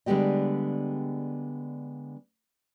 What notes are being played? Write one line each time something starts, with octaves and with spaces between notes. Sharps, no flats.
D3 G3 G#3 B3 G4 D#5